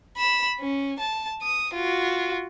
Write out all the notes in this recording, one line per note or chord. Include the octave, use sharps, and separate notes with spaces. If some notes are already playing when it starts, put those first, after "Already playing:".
B5 E7
C#4
A5
D#6
F4 F#4